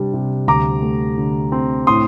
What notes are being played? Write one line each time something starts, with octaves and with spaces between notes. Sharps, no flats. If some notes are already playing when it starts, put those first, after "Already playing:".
Already playing: C3 G3 D4
C3
D2 A#5 D6
A3
D3
C4
A2 C6 D#6